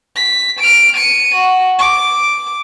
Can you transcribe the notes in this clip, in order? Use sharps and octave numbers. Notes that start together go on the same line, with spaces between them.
B6
F6 D7
C#7 D#7
F#4
D6